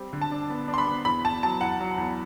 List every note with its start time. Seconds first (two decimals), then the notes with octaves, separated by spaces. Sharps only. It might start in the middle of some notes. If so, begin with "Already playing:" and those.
Already playing: G3 C4
0.13 D3
0.21 A5
0.31 D4
0.50 B3
0.68 D4
0.74 C6
0.78 B5
0.87 B3
1.05 E2 B5
1.25 E2 A5
1.43 F#3 A5
1.61 E2 F#5
1.80 F#3
1.98 E2